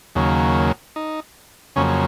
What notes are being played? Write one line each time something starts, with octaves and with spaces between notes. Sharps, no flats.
D#2 C#3 F#3 A#3
D#4
F2 C#3 F#3 A#3 C#4